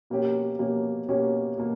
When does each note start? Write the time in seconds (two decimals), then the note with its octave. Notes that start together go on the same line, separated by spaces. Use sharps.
0.10 B2 A#3 C#4 G4
0.59 B2 A#3 C#4 G4
1.08 B2 A#3 C#4 G4
1.58 B2 A#3